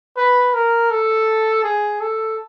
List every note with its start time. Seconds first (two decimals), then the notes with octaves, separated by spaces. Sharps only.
0.17 B4
0.54 A#4
0.90 A4
1.64 G#4
2.01 A4